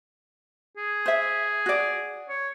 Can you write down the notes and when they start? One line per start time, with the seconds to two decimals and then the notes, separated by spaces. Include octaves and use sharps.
0.77 G#4
1.06 C5 E5
1.66 F#4 D5
2.29 C#5